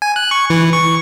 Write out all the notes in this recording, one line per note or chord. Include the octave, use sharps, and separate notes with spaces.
G#5
F#6
C#6
E3
C#6